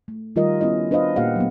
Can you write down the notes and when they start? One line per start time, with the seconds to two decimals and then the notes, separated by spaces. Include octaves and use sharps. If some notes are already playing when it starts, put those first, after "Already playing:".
0.08 A3
0.36 D#3 G3 F4 G4 A#4 D#5
0.61 B3 C#4 E4 D#5
0.91 D4 B4 C5 D#5 F5
1.16 A#2 A#3 G4 F5 F#5
1.36 F#3 A3 B3